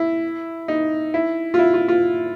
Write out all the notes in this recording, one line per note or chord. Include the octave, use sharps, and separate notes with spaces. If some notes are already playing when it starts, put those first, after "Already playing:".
Already playing: E4
D#4
E4
F4
E4
F4
F4